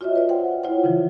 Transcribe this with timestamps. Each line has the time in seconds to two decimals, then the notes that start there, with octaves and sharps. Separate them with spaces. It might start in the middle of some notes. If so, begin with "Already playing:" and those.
0.01 F4 F#4 C#5 D#5 E5
0.16 B4 D5
0.29 C5 F#5 G5
0.63 E4 F4 C5 C#5 F#5
0.84 C#3 E3 F3